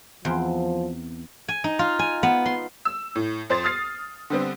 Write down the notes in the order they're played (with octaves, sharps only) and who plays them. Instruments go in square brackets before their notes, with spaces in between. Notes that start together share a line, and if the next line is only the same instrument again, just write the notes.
[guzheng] E2 C4 [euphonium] F3
[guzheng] G#5
D#4
F4
G#5
B3
C6
[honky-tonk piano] E6
A2
F2 C5 C6 A6
D#6 F6 A6 C7
D3 G3 B3 C4